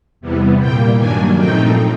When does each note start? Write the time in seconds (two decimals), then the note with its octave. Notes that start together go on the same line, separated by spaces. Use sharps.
0.21 E2 C3 E3 G3 B3
0.60 A#2 G3 A#3 G5
0.98 G2 D#3 F#3 A#3 D4 G#5
1.37 A#2 F3 A3 C4 D#4 G5